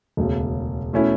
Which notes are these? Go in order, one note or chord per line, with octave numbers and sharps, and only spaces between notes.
E1 D2 C#3
B2 A3 C#4 E4